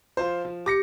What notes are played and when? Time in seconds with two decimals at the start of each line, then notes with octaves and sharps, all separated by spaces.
0.17 F3 F4 C5
0.45 F3
0.66 G4 D6 A#6 C#7